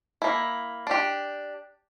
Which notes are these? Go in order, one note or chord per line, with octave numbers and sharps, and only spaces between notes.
A#3 E4
D4 G4